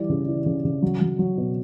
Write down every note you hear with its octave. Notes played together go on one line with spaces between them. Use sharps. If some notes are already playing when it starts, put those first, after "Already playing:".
Already playing: E3 G3 D5
C#3
E3
C#3
C#3
F#3
F#3
F#3
B2